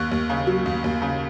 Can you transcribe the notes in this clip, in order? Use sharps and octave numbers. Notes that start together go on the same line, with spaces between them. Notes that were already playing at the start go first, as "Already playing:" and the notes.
Already playing: D#2 C#6 F#6
D#2
C#3
F#3
D#2
D#2
C#3